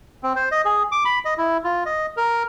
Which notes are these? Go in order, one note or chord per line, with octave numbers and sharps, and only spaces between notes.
C4
C5
D#5
G#4
D6
B5
D#5
E4
F4
D#5
A#4